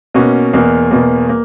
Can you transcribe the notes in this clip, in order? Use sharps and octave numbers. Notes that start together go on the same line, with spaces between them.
B2 A#3 C#4 F#4
E2 B2 A#3
E2 B2 A#3
A#3